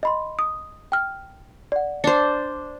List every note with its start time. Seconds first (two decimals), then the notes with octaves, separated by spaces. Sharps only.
0.03 D#5 B5 C6
0.39 D#6
0.92 G5 F6
1.72 D5 F#5
2.04 D4 C5 C6 C#7